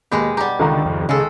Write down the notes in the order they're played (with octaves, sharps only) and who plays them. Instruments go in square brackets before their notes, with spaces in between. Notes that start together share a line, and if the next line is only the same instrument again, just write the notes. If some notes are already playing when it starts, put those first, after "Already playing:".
[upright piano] D#2 B5 [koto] B2 G#3 G4
[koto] G3 G4 [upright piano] F#5 A#5
[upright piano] C#2 D#3 A#5 [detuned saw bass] D3
[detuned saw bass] F2
[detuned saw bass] C#3 [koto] G#3 A4